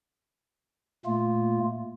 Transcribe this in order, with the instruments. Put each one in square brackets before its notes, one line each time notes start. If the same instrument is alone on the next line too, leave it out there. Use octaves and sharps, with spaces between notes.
[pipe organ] A#2 A3 A#3 F4